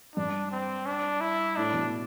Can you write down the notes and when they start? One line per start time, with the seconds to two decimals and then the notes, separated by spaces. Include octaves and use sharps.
0.16 G2 D4
0.51 C4
0.86 D4
1.21 E4
1.56 A2 D4
1.74 B2